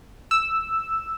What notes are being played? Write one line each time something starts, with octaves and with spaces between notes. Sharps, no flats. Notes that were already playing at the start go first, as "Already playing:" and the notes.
E6